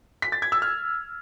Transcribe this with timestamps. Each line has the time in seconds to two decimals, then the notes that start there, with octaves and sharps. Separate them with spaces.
0.22 B6
0.32 A6
0.42 G#6
0.52 E6
0.62 F6